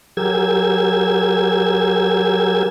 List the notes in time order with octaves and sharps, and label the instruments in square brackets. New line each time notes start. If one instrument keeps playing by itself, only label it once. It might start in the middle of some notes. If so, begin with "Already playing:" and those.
[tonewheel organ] F#3 G4 G#4 A#4 E6 G#6